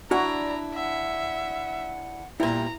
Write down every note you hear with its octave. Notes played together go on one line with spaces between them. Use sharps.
D4 E4 F#4 D5 A#5
E5 F#5
A#2 G3 E4 A#5